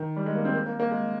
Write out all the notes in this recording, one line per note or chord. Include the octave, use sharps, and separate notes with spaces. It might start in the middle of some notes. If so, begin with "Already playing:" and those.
Already playing: D#3
G3
G#3
A#3
C4
A#3
A#3
A#3
G#3